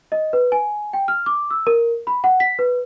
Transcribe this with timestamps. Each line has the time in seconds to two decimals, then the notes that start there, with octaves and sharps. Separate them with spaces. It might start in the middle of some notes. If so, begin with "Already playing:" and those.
0.12 D#5
0.33 B4
0.52 G#5
0.93 G5
1.08 F6
1.26 D6
1.50 E6
1.67 A#4
2.07 B5
2.24 F#5
2.40 B6
2.59 B4